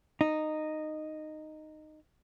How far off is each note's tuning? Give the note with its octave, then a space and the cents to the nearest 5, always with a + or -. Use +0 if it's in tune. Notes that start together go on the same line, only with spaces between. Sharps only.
D#4 -10